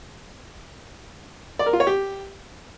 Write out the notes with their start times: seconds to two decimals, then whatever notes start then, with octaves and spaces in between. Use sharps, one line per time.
1.59 D5
1.66 A#4
1.73 F4
1.80 C#5
1.87 G4